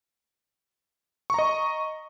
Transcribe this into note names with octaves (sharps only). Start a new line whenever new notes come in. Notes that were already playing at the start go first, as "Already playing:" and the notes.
D#5 A#5 C#6